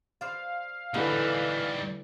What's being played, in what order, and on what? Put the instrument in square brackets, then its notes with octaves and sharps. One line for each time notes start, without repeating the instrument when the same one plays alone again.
[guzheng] C5 D5 [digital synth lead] F5
[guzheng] A2 D3 E4 [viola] E3 [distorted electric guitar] G3 D#4